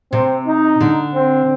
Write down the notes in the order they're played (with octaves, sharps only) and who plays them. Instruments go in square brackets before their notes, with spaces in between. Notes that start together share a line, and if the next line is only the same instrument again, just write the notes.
[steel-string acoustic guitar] C3 [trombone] C4
[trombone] D#4
[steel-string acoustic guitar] D3
[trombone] C4